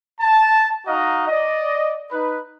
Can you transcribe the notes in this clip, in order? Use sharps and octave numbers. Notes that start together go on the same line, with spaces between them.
A5
D#4 F#4 D#5 F5 A#5
D5 D#5
D#4 B4